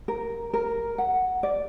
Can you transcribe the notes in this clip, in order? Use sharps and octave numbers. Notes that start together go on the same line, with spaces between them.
A#4
A#4
F#5
D5